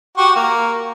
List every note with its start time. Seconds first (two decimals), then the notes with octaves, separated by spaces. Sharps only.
0.17 F#4 G4 C#6
0.36 A#3